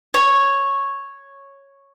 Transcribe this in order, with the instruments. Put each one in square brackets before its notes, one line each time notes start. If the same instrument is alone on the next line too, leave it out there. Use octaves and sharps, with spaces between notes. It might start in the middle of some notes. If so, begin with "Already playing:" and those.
[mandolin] C#5